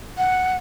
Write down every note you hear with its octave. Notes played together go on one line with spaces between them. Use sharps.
F#5